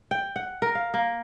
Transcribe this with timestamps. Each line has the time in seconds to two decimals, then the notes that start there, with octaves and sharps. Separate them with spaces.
0.11 G5
0.36 F#5
0.62 A#4
0.75 F5
0.94 A#3